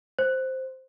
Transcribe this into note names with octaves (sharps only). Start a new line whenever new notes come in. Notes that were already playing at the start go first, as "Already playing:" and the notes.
C5